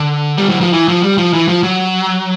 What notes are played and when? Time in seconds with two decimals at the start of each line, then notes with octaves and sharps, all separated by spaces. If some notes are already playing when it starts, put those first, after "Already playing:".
Already playing: D3
0.38 G3
0.50 F#3
0.61 F3
0.73 E3
0.88 F3
1.03 G3
1.18 F3
1.33 E3
1.48 F3
1.63 F#3